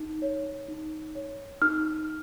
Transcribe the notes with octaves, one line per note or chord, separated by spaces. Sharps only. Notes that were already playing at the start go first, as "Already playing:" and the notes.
Already playing: D#4
C#5
D#4
C#5
D#4 F6